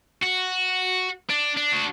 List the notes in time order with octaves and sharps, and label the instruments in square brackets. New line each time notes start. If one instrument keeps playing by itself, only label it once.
[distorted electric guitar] F#4
D4
D4
F#4